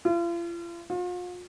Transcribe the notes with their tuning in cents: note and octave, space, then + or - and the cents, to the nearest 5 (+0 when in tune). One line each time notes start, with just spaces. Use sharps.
F4 -40
F4 +40